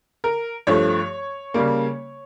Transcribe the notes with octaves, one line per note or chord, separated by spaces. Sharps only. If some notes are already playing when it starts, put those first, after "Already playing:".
A#4
G2 F3 A3 C#5
C#3 G3 A#3